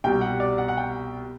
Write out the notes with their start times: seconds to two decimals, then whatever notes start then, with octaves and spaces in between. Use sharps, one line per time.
0.04 C2 B2 G3 G5
0.21 F#5
0.40 D5
0.58 F#5
0.68 F#5
0.77 G5